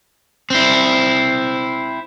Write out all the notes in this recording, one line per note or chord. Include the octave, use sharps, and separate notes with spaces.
C4 E4